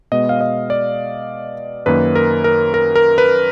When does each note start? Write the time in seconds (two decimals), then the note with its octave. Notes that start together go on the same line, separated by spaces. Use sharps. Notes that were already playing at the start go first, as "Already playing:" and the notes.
0.12 B2 G#3 B3 D#5
0.29 F5
0.41 D#5
0.70 D5
1.86 F#2 D#3 A#3 B4
2.15 A#4
2.44 A#4
2.74 A#4
2.95 A#4
3.18 B4